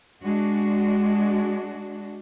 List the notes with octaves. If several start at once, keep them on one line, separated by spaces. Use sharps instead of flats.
G#3 D4 F#4